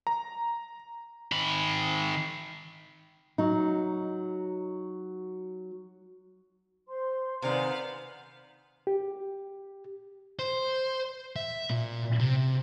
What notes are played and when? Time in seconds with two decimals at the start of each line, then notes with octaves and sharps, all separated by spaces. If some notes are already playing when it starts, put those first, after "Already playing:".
0.07 A#5
1.32 D#3 B5
3.38 F#3 D#4
6.88 C5 C6
7.42 C3 D#3 B3 C5 D5 F5 G#5
8.87 G4
10.39 C5
11.36 E5
11.70 A#2
12.19 C3